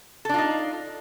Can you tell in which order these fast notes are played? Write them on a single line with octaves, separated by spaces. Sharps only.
A4 D4 F4 D#4